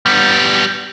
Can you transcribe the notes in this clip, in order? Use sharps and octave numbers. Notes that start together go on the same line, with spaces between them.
G3 B3